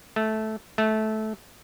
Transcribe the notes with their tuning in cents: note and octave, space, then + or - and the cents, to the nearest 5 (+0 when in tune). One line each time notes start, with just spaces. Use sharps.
A3 -10
A3 -15